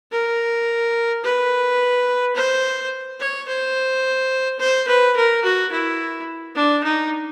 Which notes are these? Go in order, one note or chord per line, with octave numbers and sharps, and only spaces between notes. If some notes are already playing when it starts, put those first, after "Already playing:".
A#4
B4
C5
C#5
C5
C5
B4
A#4
F#4
E4
D4
D#4